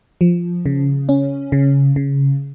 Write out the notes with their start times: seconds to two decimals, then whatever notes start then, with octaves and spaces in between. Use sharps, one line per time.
0.21 F3
0.66 C#3
1.09 C#4
1.52 C#3
1.96 C#3